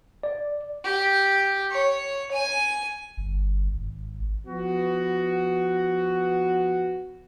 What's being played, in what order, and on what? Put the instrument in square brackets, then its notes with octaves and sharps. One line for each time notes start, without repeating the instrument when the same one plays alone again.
[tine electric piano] D5
[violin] G4
C#5
G#5
[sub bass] G1
G#1
[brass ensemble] F3 B3 F#4